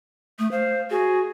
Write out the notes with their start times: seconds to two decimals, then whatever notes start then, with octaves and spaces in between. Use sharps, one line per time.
0.39 A3 D#6
0.51 C5 F5
0.90 F#4 G#4